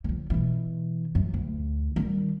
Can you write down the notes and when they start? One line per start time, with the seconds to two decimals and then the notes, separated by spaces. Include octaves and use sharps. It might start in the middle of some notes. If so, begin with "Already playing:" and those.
0.04 D3 F3
0.30 B2 E3
1.15 F#2
1.34 D2
1.96 D#3 G3